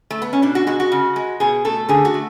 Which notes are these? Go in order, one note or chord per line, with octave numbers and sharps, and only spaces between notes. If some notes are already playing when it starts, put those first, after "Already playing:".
A3
B3
C#4
B2 D4
F#4
G#3 F#4
F#4
C#3
G#3
B2 G#4
A3 A4
D3 G#4
F#4
A3